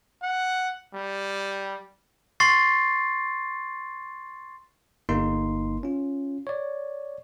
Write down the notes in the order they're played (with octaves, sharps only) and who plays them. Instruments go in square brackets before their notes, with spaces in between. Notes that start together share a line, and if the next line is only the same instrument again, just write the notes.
[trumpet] F#5
G3
[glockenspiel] C6 C#6 A6 C7
[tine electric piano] G1 A#3 D#4 C6
C#4 F4
C#5 D5